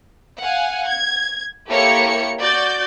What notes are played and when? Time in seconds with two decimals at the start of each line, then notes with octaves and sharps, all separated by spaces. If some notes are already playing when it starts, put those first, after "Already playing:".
0.40 F5 F#5 G#5
0.86 G#6
1.68 A#3 E4 G4 A4 C#5 C#7
2.38 F#4 D5 G6 A6